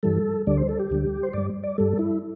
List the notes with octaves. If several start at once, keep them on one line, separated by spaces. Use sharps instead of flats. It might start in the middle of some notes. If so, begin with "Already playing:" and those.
G2 E3 G3 A4
D2 D3 G3 D5
C5
A4
G4
D2 D3 G3
C5
G2 G3 D5
D5
G2 G3 A4
E4